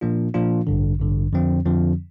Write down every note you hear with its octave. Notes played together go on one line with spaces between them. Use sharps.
A#2 F3 A#3 D4 F4
A#2 F3 A#3 D4 F4
A1 G2 D3
A1 G2 D3
F2 D3 F3 C4
F2 D3 F3 C4